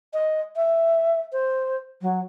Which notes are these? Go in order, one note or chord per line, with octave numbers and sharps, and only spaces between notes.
D#5
E5
C5
F#3